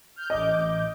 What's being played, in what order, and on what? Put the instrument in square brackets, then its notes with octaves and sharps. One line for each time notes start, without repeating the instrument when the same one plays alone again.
[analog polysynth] F6 G6
[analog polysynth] A1 D6 G6 [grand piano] D#5